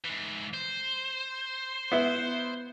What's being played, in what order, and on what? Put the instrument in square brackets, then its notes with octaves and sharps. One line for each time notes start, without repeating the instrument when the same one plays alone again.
[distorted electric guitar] G#2 E3
C5
[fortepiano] B3 E4